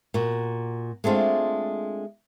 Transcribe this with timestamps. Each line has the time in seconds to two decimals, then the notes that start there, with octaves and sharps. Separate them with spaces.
0.14 A#2 F#4
1.04 G#3 A3 C4 D4 F4